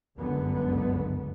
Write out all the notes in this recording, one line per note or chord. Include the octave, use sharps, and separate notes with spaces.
G1 C#2 F#2 D3 G#3 B3